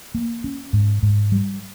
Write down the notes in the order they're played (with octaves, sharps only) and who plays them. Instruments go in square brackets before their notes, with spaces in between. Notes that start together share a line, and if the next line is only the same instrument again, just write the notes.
[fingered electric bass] A#3
C#4
G#2
G#2
G3